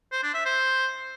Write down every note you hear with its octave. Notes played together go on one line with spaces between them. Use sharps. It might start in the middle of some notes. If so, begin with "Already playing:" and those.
C5
D4
E5
C5